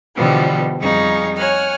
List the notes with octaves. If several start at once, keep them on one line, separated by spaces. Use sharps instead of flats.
B2 D3 E3 F3 G3 B3
F2 G3 D#4 G#4 F5 C#6
C#5 F#5 G#5 F6